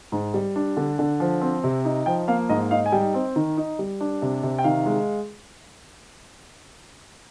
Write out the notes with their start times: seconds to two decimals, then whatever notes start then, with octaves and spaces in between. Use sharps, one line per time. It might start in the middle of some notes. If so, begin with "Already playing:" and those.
0.12 G#2
0.34 G3
0.56 D4
0.77 D3
0.99 D3
1.20 F3
1.41 C4
1.64 C3
1.85 D#4
2.06 F3 G5
2.28 A#3 F5
2.49 G#2 D#5
2.71 D#4 F5
2.86 G#5
2.92 G3 G5
3.14 C4
3.36 D#3
3.57 D#4
3.79 G3
4.01 D4
4.22 C3
4.43 C3
4.59 G5
4.64 D#3 F5
4.86 G#3